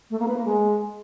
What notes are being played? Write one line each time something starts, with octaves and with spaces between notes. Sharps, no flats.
A3
A#3
B4
A#3
G#3